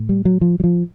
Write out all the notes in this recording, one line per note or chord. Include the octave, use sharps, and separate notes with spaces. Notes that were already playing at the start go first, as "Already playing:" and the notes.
Already playing: A2
G3
F#3
F3
F#3
F3